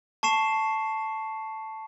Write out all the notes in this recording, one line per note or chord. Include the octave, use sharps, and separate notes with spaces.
A5 C#6 C7 E7